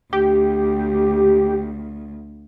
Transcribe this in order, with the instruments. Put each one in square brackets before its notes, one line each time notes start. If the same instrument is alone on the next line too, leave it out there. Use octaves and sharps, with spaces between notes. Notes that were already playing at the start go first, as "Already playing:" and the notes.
[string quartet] D2 [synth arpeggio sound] G4